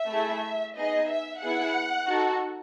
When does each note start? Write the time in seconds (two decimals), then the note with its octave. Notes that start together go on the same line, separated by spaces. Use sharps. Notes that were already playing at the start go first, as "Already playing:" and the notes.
Already playing: E5
0.08 A3 E4 G#4
0.75 B3 D#4 G#4 D#5
1.08 E5
1.41 B3 E4 G#4 F#5
2.08 D#4 F#4 A4